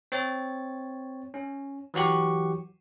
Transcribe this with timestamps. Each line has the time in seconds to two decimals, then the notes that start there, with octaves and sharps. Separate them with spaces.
0.12 C4 C#5 A6
1.34 C#4
1.94 E3 F#3 F#4 G4 C#6